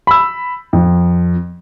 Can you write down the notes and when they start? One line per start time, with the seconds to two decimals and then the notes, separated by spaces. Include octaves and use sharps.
0.07 B5 E6
0.73 F2